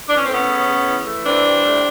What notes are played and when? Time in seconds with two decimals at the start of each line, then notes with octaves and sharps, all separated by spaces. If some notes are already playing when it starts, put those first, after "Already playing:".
0.09 E3 D4
0.17 C#4
0.25 A3 C4
0.34 B3 C#4
0.48 C#3
0.68 C#3
0.86 E3
1.06 A3
1.26 E3 C4 D4
1.45 G3
1.64 A2